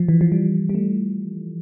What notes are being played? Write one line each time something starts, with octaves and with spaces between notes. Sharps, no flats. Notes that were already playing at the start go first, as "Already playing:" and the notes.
Already playing: F3
E3
F3
G3
G3
A3